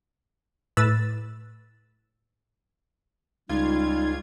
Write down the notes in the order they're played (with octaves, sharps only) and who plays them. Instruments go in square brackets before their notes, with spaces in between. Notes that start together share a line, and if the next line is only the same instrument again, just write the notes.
[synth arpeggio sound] A2 B4 E6 A6
[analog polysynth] C#2 F4 G#6 [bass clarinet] G3 [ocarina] D#4